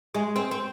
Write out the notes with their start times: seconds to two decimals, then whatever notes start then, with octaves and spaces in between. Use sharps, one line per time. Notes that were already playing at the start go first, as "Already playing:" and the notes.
0.14 G#3
0.36 C4
0.51 C4